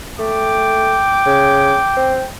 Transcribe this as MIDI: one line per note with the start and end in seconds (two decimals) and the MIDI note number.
0.19 0.98 57
0.19 2.30 79
0.19 2.16 86
1.27 1.77 49
1.97 2.23 60